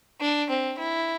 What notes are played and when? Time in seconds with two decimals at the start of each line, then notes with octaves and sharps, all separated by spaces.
0.20 D4
0.49 C4
0.78 E4